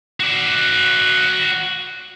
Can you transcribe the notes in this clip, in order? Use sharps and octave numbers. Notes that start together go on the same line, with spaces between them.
F#4 D5